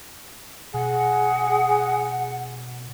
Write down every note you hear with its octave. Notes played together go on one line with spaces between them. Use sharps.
B2 G#4 F#5